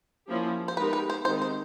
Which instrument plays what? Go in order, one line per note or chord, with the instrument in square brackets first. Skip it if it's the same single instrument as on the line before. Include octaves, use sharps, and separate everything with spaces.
[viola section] F3 A#3 C#4 E4 G4
[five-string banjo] C5
[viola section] G#3 B3 D#4 G4 A#4 [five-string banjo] B4
[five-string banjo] B4
C5
[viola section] D#3 G#3 C4 D#4 G4 [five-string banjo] C5
[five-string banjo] C5